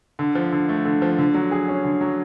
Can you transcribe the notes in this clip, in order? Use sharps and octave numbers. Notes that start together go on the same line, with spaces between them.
D3
F3
D3
A3
D3
F3
D3
F#3
G#4
C#4
D3
F#3